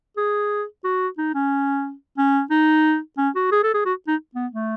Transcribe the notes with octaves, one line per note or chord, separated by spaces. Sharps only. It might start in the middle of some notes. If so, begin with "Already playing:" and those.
G#4
F#4
D#4
C#4
C#4
D#4
C#4
F#4
G#4
A4
G#4
F#4
D#4
B3
A3